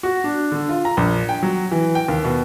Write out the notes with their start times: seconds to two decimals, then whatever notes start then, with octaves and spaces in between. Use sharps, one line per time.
0.03 F#4
0.24 D4
0.52 D3
0.69 F4
0.85 A#5
0.97 A#1
1.29 G5
1.43 F#3
1.72 E3
1.95 G5
2.08 D#2
2.25 B2